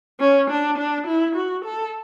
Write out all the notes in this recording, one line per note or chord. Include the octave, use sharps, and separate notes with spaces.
C#4
D4
D4
E4
F#4
A4